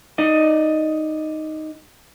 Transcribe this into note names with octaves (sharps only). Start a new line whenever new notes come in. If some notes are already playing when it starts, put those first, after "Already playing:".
D#4 D5 D#5